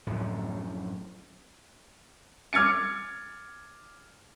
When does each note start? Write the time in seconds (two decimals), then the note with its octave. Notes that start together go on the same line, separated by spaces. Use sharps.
0.07 D1 F#2 A2 F3
2.53 D6 F6 G#6 A6 C#7